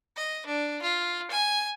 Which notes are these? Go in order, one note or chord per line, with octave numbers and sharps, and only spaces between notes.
D#5
D4
F4
G#5